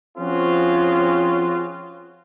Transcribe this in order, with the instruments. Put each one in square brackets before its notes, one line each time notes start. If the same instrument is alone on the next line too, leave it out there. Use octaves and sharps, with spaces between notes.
[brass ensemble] F3 C4 C#4 F4 F#4 G#4